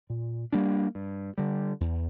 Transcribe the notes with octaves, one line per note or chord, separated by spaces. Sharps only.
A#2
G3 A#3 D4
G2
D3 G3
E2